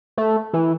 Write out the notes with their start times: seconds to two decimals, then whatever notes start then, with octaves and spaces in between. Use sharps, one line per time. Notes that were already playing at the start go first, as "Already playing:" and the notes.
0.17 A3
0.53 E3